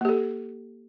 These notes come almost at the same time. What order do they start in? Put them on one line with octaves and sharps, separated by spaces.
A#3 G4 A4